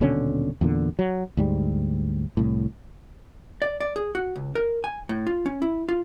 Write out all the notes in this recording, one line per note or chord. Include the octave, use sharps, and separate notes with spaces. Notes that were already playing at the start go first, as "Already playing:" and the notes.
D#1 B2 D3 C#4
E2 A#2 D3
F#3
D2 G#2 G3
C2 A2
D5
D5
G#4
F#4
C#2
A#4
G#5
A2
F4
C#4
E4
F4